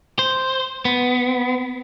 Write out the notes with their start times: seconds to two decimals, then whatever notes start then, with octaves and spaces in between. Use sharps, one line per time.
0.19 C5
0.85 B3